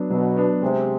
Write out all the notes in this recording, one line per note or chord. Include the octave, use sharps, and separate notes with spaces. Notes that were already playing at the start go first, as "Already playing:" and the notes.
Already playing: F#3 B3 D4
B2 F#3
B3 D4
C3 G#3